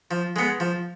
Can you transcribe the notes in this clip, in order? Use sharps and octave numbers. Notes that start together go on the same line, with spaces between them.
F3
G#3 B3
F3